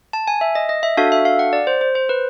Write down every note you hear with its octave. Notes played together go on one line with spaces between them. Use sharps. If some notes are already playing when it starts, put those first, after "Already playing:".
A5
G#5
E5
D#5
D#5
E5
D4 F#4 A4 F5
E5
F5
F#5
D5
C5
C5
C5
B4